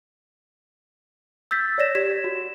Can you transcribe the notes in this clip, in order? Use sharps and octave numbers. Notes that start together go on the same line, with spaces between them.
E6 G6 A6 B6
C#5 D5 A#6 E7
G4 G#6 B6 E7
F#4